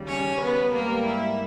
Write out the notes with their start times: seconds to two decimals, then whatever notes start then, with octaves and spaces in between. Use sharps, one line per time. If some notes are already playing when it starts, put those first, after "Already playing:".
Already playing: D#2 C#3 G3
0.08 C#4 C#5
0.41 B3 B4
0.74 G#2 G3 A#3 A#4
1.07 E4